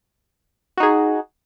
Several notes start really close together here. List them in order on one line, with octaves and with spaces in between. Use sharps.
F#4 D#4 G#4